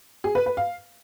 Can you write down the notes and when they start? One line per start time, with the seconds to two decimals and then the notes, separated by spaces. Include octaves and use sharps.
0.24 G#4
0.35 B4
0.46 B4
0.57 F5